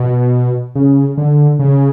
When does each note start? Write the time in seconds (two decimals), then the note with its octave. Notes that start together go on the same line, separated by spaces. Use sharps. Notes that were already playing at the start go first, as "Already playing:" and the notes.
Already playing: B2
0.75 C#3
1.18 D3
1.59 C#3